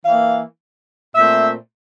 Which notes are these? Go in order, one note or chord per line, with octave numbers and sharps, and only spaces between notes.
E3 A#3 F5
A#2 A3 C4 E5